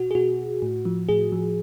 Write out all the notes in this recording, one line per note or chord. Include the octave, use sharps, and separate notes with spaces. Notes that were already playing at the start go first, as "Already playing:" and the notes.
Already playing: B2 F#4
G#4
B2 F#4
A2
F3
A2 G#4
F3